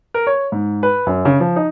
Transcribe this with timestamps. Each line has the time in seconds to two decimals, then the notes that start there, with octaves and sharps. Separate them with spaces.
0.14 A#4
0.27 C#5
0.52 G#2
0.83 B4
1.07 F#2
1.25 C#3
1.40 F3
1.56 D#4